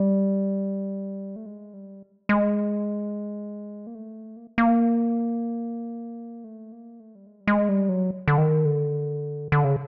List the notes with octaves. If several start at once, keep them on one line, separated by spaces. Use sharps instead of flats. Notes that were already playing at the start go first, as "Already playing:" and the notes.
Already playing: G3
A3
G#3
G3
G#3
A#3
A3
A#3
A#3
A3
A#3
A3
G3
G#3
G3
G#3
G3
F#3
D3
D#3
D3
D3
C#3